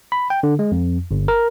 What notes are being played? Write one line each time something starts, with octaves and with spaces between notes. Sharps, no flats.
B5
G5
D3
G#3
F2
G1
A#4